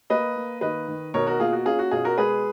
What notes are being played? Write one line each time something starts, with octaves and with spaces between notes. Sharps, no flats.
A#3 B4 D#5
A#3
D#3 B4 D#5
D#3
B2 A#4 C#5
F#4 A#4
A#3 F4 G#4
F#4
C#4 F4 G#4
F#4
B2 F4 G#4
F#4 A#4
G#3 G#4 B4